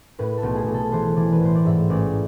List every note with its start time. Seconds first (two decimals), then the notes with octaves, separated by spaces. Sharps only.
0.19 A2 B4
0.37 A4
0.43 B1
0.55 G#4
0.67 B1
0.74 A4
0.92 E3 C5
1.16 E3 D5
1.32 B4
1.41 A2 C5
1.55 D5
1.65 G#2 E5
1.90 A1 D5